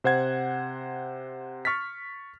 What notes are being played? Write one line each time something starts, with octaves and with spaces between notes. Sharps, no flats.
C3 C5 F#5 G#6
C#6 F6 A6 B6